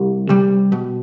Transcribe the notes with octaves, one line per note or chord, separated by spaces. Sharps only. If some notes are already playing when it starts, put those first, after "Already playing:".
Already playing: C2 G4
C3 G3
B2